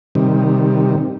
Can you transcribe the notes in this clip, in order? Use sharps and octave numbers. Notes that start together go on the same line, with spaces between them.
C3 D#3 G3